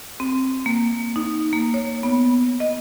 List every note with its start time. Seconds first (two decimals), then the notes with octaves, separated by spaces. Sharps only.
0.20 C4
0.66 A#3
1.16 D#4
1.53 A#3
1.74 C#5
2.03 B3
2.60 D#5